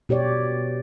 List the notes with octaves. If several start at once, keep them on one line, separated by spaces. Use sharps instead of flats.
B2 G4 C#5 D5